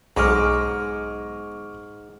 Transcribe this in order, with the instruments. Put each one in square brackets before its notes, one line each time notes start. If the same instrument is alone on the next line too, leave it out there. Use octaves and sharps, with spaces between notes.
[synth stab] B1 [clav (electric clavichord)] G#2 [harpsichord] G#3 G#4 D#5 [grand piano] C#6 D6 F6